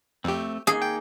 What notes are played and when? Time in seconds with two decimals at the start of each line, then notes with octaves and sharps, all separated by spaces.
0.24 F2 A3 C4 G4
0.67 A#3 D#4 G#4
0.82 G5